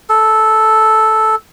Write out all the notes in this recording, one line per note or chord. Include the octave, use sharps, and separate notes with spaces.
A4